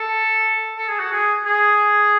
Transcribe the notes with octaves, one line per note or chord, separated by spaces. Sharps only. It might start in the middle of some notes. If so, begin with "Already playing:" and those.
Already playing: A4
A4
G#4
F#4
G#4
G#4